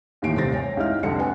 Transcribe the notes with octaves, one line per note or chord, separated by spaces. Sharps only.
D#2 A2 D#3 E3 C7 D7
D#1 C2 C3 C4 A6 A#6
C#5 G5 G#5
C#2 D#4 E4 F6
C2 F2 D3 A4 C#7
B4 F#5 G#5